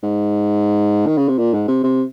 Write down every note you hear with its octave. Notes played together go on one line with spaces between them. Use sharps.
G#2
D#3
C#3
C3
A#2
G#2
C3
C3